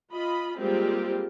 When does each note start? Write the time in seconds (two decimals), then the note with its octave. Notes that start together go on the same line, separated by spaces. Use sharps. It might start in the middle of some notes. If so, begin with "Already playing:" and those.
0.13 F4 D#5 B5
0.60 G3 G#3 A#3 C4 F4 G4